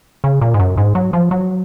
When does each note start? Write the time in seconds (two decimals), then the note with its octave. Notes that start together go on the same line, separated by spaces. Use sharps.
0.24 C#3
0.41 A#2
0.54 G#2
0.60 F#2
0.77 G#2
0.95 F#3
1.13 F3
1.31 F#3